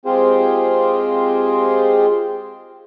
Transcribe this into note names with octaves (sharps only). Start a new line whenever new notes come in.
G#3 C4 F4 G4 G#4 C5